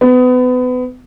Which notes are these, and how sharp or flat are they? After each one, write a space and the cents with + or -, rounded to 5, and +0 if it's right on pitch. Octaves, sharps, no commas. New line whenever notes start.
B3 +30